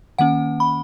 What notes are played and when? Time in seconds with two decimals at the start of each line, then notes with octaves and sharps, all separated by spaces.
0.18 D#3 A#3 C#4 F#5
0.60 B5